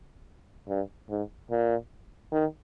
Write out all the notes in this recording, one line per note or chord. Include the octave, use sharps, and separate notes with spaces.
G2
G#2
A#2
D#3